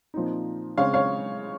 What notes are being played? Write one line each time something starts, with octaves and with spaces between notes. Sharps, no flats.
A#2 F3 C4 D#4
C#3 G#3 C4 C#5 F5
C#5 F5